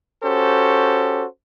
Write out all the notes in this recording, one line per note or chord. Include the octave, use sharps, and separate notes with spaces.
C#4 F#4 G4 A4 C5